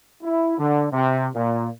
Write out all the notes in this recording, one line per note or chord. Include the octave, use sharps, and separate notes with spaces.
E4
D3
C3
A#2